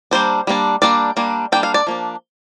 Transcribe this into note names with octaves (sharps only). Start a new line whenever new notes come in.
G3 A#3 D4 C5
G3 A#3 D4
G3 A#3 D4 D5
G3 A#3 D4
G3 A#3 D4 G5
F5
D5
F3 A#3 D4